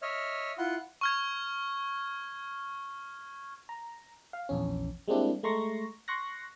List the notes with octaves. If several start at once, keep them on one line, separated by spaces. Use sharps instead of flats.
C#5 D#5 E5 F6
E4 F4 F#5 C6
C#6 F6 G#6
A#5
F5
A#1 E2 C#4
G3 G#3 A#3 C4 D4 E4
G#3 A3 A#5 C6 C#6 A#6
C6 C#6 F#6 A#6